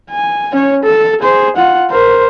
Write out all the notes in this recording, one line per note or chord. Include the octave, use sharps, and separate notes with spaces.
G#5
C#4 C#5
A4
G#4 C5
F4 F#5
A#4 C5